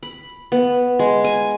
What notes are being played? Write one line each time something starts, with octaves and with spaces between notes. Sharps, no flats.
B5
B3
G#3
G#5